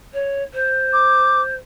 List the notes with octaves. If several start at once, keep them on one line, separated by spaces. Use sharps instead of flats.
C#5
C5
D6